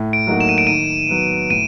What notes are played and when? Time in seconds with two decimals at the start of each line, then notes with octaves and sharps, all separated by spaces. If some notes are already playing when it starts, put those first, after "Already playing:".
Already playing: A2
0.13 D7
0.27 F#3 A#3 D#4 F#4
0.40 E7
0.49 D#7
0.58 D7
0.67 D#3 D#7
1.09 F#3 B3
1.50 A2 D#7